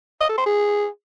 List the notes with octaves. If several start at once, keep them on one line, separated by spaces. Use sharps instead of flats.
D#5
A4
C5
G#4